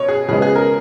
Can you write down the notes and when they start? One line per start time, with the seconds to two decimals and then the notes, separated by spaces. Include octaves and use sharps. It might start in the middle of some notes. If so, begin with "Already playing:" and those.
Already playing: B2 C#5
0.09 G#4
0.29 C#3 F3 G#3 B3 G#4
0.42 G#4
0.56 A#4